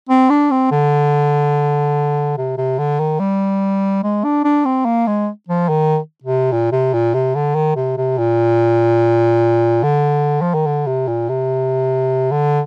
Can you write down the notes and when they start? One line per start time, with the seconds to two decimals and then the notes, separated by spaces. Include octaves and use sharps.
0.09 C4
0.30 D4
0.51 C4
0.71 D3
2.38 C3
2.57 C3
2.79 D3
2.99 D#3
3.20 G3
4.03 G#3
4.24 D4
4.44 D4
4.65 C4
4.85 A#3
5.07 G#3
5.48 F3
5.69 D#3
6.23 C3
6.52 A#2
6.72 C3
6.93 A#2
7.14 C3
7.35 D3
7.55 D#3
7.76 C3
7.97 C3
8.18 A#2
9.83 D3
10.41 F3
10.54 D#3
10.66 D3
10.86 C3
11.07 A#2
11.29 C3
12.31 D3